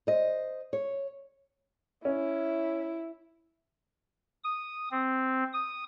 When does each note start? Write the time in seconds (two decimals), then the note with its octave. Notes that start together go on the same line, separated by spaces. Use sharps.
0.07 C5 D#5
0.73 C#5
2.05 C#4 E4
4.44 D#6
4.91 C4
5.53 D#6